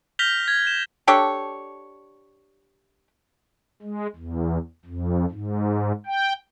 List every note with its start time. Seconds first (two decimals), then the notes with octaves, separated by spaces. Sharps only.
0.19 F6 G6 A#6 B6 F7 G7
0.48 G#6
0.67 E7
1.07 D4 G4 A4 C#5
3.82 G#3
4.16 E2
4.85 F2
5.31 G#2
6.07 G5